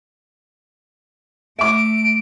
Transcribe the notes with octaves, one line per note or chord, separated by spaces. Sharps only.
A3 E5 D6 D7